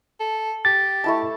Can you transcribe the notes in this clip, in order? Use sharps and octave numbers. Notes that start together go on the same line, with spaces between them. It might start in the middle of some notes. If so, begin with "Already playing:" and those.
A4
G4 A6
A3 E4 A5